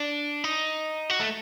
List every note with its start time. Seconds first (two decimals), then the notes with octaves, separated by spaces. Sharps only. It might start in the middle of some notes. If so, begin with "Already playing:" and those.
Already playing: D4
0.44 D#4
1.10 F#4
1.20 A3